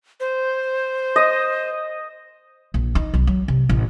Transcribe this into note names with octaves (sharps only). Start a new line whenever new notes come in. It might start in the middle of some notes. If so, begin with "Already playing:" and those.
C5
D#5
A#1
D#4
B1
F#3
C3
A1